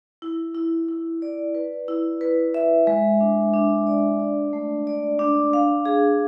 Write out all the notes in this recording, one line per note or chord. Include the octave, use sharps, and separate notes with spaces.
E4
E4
E4
D5
B4
E4
B4
E5
G#3
D4
D4
D5
D5
A3
D5
D4
F5
G#4